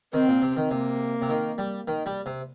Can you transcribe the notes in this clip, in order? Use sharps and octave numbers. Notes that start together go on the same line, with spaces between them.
D#3 C4
A#2
C3
D#3
C3 A#3
C3
D#3
G3
D#3
G3
C3